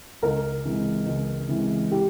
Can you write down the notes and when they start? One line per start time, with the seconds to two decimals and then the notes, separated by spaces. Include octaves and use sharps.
0.22 C#2 A#4
0.65 C3 E3 G#3
1.06 C#2
1.48 C3 E3 G#3
1.91 G4